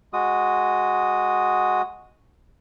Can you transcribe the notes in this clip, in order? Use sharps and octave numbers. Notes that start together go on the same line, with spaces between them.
G#3 F#4 D#6